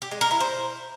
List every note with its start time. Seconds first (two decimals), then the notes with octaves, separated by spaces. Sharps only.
0.02 G4
0.11 G#3
0.21 A#4
0.31 E4
0.40 C5